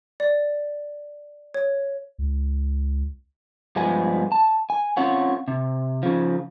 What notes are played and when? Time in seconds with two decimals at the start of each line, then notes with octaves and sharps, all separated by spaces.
0.20 D5
1.54 C#5
2.18 C#2
3.76 G2 F3 G#3 B3 G#5
4.32 A5
4.70 G#5
4.97 C4 C#4 F4 C#5 F#5
5.48 C3
6.03 C#3 F3